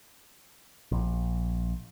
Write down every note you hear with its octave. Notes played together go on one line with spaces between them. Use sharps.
A#1